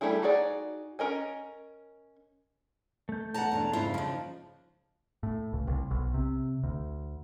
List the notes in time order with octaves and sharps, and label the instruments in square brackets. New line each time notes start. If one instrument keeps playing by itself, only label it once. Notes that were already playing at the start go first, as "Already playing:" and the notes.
[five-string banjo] G3 A3 D4 E4 G#4
D#4 F#4 G#4 D5
C#4 A#4 D#5 G#5
[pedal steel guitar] A3 G6
[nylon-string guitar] E2 F#5 [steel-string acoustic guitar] A5 A#5
[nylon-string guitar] E2 B2 D4
[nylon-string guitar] F2 G#2 E4 [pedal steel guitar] C#3 C5 [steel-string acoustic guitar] F4
[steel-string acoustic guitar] D#2 D4 [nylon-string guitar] F3 D#4
[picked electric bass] A2
C#2
C2
B1
C3
D2